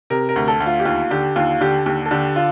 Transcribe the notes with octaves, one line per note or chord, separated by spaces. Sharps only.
C3 A#4
A#4
D2
A4
D2
F4
G4
D#2 F4
D3 G4
D#2 F4
D3 G4
D#2 G4
A4
D3 G4
F4